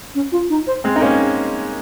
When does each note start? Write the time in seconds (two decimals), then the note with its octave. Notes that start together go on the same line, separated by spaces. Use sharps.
0.15 C#4
0.32 F4
0.49 D#4
0.67 C5
0.84 G#3 C4
0.96 D#4
1.02 A#3 C#4